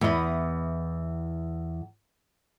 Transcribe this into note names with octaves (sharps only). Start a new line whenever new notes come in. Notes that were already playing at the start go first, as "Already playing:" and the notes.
E2 B3 E4 D#5